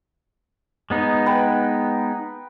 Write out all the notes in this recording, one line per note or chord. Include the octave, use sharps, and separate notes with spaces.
G#3 B3 D#4
B4 G5